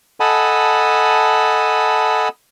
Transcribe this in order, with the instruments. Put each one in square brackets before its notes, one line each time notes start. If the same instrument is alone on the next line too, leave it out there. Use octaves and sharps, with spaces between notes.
[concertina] A4 D#5 F#5 G#5 A5 B5